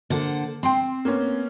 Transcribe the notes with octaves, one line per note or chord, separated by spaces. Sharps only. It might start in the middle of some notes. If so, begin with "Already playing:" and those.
D3 A#3 C5 F#5
C4 G5 C6
A#3 B3 C#4